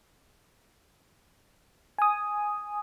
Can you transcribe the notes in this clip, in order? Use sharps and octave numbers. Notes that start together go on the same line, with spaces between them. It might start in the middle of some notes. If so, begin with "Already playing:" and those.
G#5 D#6